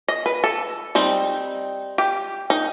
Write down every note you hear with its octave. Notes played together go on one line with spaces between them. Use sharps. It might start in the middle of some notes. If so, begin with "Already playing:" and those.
D#5
B4
A4
G3 C4 D#4
G4
D#4